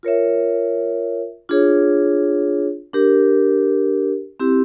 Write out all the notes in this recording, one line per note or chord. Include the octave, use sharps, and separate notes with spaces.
F4 A#4 C#5 E5
D4 F4 G#4 C#5
D4 G4 A#4
C4 E4 G4